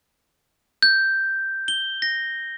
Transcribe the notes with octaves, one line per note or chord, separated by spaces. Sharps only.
G6
G7
A#6